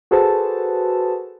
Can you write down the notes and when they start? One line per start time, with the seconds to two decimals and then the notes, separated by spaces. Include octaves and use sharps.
0.11 F#4 G#4 A4 B4 C5 A5